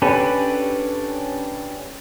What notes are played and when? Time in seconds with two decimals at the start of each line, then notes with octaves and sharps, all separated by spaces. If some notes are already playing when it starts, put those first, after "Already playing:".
0.02 C#4 D4 G4 A4 B4